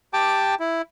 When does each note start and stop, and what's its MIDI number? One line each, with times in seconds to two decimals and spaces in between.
0.13 0.55 67
0.13 0.55 79
0.13 0.55 81
0.13 0.55 86
0.60 0.82 64